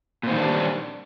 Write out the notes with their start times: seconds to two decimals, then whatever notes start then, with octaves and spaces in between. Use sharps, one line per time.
0.23 A#2
0.27 C4
0.31 D#3
0.34 G3
0.38 D4